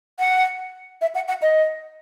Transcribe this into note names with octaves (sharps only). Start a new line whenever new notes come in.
F#5
E5
F#5
F#5
D#5